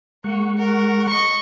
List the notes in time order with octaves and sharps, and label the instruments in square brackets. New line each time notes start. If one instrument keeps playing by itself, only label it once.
[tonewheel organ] G#3 F#5 C#6 [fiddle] A#3
[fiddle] A#4
D#5 C#6